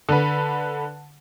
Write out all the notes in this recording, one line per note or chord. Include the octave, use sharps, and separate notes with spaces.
D3 B4